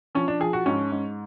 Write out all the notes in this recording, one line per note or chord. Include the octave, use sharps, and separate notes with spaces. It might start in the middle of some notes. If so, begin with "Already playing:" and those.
F3 C#4
D4
F3 G#4
F#4
G#2 C#4
G#2